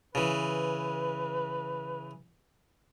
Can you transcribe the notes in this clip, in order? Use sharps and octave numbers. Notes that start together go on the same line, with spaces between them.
C#3 E3 B4